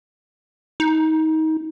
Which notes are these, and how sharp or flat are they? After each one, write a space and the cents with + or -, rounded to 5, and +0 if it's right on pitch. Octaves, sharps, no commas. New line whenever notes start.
D#4 +25